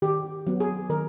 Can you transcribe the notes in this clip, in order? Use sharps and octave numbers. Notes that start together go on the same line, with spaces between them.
D#3 G4
F#3 B3
G#4
D#3 A#4